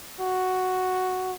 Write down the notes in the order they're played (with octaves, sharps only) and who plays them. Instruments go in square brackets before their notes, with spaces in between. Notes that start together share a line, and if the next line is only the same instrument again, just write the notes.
[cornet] F#4